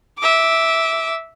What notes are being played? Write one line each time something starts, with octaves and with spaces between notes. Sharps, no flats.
E5 D6